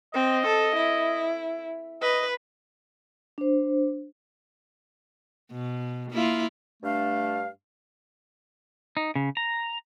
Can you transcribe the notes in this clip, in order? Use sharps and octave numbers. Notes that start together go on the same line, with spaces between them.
C4 D#5
A4
E4
B4 D#5
D4 C5
B2
A#3 E4 F4
G2 A3 D4 F5
D#4
C#3
A#5